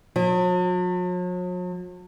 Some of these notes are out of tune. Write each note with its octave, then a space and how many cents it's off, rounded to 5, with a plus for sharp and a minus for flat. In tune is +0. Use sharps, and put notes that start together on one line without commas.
F#3 -45